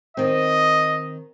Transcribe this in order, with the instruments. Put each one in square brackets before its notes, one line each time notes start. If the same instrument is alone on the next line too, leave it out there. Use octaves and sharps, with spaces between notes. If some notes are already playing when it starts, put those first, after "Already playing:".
[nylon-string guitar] D#3 C4 [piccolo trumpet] D#5